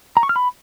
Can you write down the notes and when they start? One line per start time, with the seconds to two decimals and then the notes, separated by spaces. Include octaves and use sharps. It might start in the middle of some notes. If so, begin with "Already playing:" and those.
0.17 A#5
0.23 C#6
0.29 F6
0.36 B5